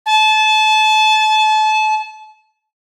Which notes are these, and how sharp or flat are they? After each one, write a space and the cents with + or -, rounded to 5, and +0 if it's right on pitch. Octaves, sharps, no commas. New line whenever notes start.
A5 -30